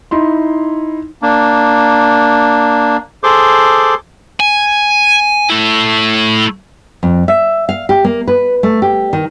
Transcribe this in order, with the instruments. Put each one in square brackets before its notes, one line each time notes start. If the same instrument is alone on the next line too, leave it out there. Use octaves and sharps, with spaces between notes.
[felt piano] D#4 E4 C6
[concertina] A#3 D4
G#4 A4 C5 C6 D6
[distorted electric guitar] G#5
A3 E4
[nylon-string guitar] F2
E5
F5
G4
A#3
B4
A3
G4
D#3